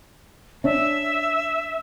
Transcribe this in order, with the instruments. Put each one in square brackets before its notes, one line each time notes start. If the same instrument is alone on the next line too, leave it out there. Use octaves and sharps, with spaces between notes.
[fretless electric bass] C#4 D4 [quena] E5